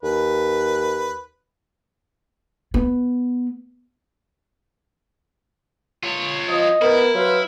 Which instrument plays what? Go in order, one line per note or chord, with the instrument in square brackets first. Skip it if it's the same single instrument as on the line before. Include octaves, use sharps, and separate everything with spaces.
[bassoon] D#2 [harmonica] B4
[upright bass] B3
[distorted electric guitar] F4 C#5
[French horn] F3 [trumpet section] D#5
[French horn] B3 [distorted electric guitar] E4 [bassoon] A#4
[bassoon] F#3 [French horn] B4 [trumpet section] C5 F5